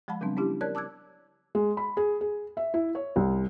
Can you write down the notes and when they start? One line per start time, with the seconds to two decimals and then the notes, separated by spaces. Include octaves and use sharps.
0.08 F3 G#3 F#5 A5 B5
0.21 C#3 F#3 G3 B3 C4 D4
0.37 B3 C#4 D4 E4 G4
0.61 A#4 C#5 D5 A5 F#6 G#6
0.75 A5 D6 E6 F#6 G#6
1.55 G#3
1.77 B5
1.97 G#4
2.21 G#4
2.57 E5
2.74 E4
2.95 C#5
3.16 C2